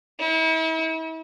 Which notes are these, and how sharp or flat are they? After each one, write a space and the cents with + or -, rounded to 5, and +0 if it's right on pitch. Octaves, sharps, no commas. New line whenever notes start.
E4 -40